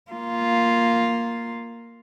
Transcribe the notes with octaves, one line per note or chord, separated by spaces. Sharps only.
A#3 F4